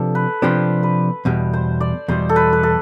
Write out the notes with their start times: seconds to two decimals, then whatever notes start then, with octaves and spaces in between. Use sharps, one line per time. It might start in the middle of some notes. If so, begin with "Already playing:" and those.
Already playing: C3 F3 B3 D4 G4 A4
0.15 B4
0.42 C3 F3 B3 D4 G4 B4
0.83 B4
1.25 E2 B2 G3
1.53 C5
1.80 D5
2.08 E2 B2 G3 C5
2.29 A4
2.36 B4
2.53 B4
2.63 A4